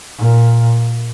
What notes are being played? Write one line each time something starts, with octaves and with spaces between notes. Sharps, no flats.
A#2